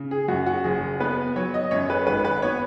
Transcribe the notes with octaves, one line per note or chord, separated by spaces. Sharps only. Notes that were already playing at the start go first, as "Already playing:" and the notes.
Already playing: C#3
G#4
F#2 F#4
F#4
F#1 G#4
B3 B4
F#3 C#5
D#5
F#2 C#5
B4
G#1 B4
B4
B3 C#5